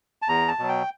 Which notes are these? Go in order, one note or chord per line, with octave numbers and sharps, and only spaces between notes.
A5
E2 A#5
A5
B2 F#3
G5